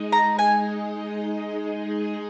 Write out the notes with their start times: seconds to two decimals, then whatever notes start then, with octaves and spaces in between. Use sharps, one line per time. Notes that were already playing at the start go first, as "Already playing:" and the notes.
Already playing: G#3 D#4 G#4 D#5
0.12 A#5
0.39 G#5